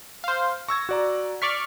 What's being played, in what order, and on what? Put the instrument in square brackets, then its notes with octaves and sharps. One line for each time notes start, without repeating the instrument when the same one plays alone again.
[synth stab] C5 F5
[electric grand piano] C#6 E6 G#6 [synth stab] A#6
[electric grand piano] F#4 D5 A#5
[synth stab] D5 C#6 F6 [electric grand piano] B6